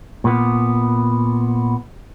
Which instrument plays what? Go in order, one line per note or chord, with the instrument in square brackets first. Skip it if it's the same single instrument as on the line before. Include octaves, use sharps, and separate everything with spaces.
[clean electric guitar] A#2 B3